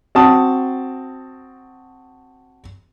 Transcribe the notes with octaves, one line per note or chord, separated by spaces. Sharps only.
C4 F#4 A5 D#6